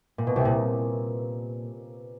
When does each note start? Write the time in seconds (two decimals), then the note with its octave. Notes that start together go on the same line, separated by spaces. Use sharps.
0.18 A#2
0.27 B2
0.36 C2 C3
0.45 A#2